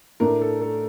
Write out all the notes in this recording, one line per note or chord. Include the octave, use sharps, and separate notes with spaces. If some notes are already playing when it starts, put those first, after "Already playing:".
A2 A3 D4 A#4
A4
A4